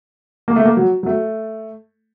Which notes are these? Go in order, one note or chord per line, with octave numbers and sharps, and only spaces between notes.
A#3
A3
A#3
F#3
F#3
A3